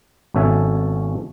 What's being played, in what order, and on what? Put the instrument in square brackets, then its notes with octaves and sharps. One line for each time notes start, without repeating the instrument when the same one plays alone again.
[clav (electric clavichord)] G#1 B2 C#4 A4 E5 G#5